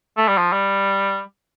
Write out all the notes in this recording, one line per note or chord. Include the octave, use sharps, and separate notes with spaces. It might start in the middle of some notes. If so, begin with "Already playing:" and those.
A3
G3
F3
G3